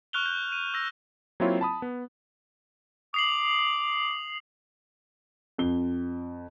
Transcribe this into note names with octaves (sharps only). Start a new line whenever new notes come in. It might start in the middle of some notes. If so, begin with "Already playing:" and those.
C#6 F6 F#6 F7 G7
G6
D#7
E6 G6 A#6
F#3 A#3 C4 E4 F4 C#5
A5 B5 D#6
B3
D6 D#6 C7 F#7
F2 G7